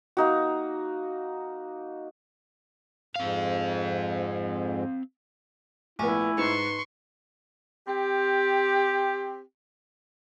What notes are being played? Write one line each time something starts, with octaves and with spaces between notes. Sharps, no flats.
A#3 D#4 F#4
F2 G#2 C4 F5
A#1 A3 B3 E4 G#5 C#6
G#2 D#4 B4 C6 C#6
C4 G4